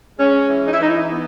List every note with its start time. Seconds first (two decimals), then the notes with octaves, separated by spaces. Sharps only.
0.19 G#3 C#4
0.49 E3
0.65 D#4
0.72 E4
0.80 E3 D#4
0.88 E4
0.97 D#4
1.11 B3